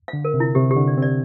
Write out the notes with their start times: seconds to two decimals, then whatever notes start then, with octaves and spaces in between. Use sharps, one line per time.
0.08 F5
0.13 D3
0.25 A#4
0.34 C3
0.40 E4
0.55 C3 G4
0.71 G4
0.77 D3
0.88 D5
0.97 C4
1.02 D5